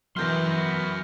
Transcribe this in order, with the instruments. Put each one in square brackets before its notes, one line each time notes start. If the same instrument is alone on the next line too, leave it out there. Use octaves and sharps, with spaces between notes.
[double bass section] E3 [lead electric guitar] F#3 A#4 [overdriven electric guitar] B3 C6 [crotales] F6 G6 A#6